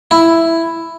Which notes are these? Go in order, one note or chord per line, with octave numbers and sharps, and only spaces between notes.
E4